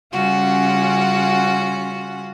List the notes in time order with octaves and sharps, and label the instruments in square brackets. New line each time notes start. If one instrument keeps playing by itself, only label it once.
[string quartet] C#3 G3 C#4 F4 F#4 F#5